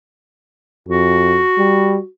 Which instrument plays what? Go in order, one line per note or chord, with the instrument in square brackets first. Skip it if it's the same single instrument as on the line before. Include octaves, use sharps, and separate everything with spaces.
[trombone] F2 [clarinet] F#4
[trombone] G3